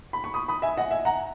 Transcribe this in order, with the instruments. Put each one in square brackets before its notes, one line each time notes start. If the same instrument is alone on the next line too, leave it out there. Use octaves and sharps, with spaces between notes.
[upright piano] B5
C#6
B5 D#6
B5 D#6
E5 G#5
D#5 F#5
E5 G#5
F#5 A#5